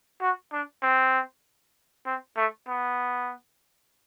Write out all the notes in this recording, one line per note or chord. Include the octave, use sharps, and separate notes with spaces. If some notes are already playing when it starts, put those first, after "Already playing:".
F#4
D4
C4
C4
A3
B3